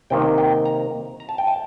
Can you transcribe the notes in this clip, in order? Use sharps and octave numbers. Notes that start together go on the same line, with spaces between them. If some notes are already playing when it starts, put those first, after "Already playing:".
C3 D#3 A#3 G5
G5
A#5
A#5
A5
G5
A5